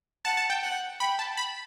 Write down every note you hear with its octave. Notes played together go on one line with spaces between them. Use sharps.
F#5 A5
A5
G5
F#5
G5 B5
A5
B5